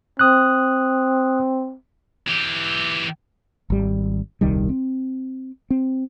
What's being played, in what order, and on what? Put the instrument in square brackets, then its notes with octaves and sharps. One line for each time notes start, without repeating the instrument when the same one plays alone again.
[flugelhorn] C4 [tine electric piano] D#6 F#6
[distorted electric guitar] E3 G4
[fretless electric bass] G#1 G3
D#1 C2 D#3 G3
C4
C4